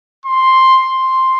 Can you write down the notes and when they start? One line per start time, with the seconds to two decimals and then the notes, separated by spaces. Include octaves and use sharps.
0.26 C6
0.82 C6